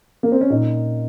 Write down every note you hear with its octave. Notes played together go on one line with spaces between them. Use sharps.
A#3
C4
C#4
A#2 D#4